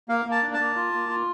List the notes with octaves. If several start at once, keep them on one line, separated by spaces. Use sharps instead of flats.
A#3 F5
A#3
A5
D4
A5
A#3
F4
A#3
F4